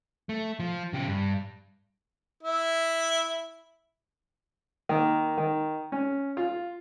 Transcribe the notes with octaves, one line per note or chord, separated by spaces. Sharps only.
A3
F3
C#3 G4
G2
E4
D#3 A#3
D#3
C#4
F4